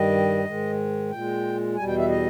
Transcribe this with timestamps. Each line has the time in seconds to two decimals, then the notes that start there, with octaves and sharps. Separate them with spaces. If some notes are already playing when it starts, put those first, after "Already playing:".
Already playing: G2 D#3 G3 D#5
0.45 G#2 D#3 G#3
1.10 A#2 G#3 G5
1.76 E2 B2 G3 G#5
1.87 G5
1.98 E5
2.09 D#5